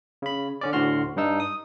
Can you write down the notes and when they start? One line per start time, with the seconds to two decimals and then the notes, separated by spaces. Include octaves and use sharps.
0.22 C#3 B5
0.61 D3 C#4 D5
0.73 D2 A2 D3 F#4 C6 F6
1.16 G2 D4 D#4 E6
1.40 D#6